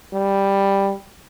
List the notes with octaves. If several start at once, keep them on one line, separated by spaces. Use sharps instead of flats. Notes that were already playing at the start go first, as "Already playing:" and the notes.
G3